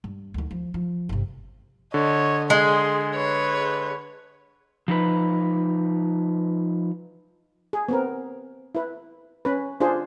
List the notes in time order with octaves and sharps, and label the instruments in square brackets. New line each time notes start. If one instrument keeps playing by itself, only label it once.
[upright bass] G2
D2 D#3
F3
F3
G1 C3
[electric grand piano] D3 [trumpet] C#5 [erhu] D#5
[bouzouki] G#3 [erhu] G#4 [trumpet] C6
[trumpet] B4 [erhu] C#5
[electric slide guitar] F3 D#4 B4
[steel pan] G#4
B3 C4 A#4
E4 B4
C#4 B4
D4 F4 G#4 C5